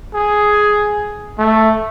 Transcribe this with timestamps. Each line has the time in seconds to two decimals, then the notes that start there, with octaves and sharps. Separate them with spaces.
0.14 G#4
1.38 A3